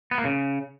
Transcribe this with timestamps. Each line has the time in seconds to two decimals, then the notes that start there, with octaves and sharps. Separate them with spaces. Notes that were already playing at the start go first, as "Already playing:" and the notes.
0.11 B3
0.18 A#3
0.25 C#3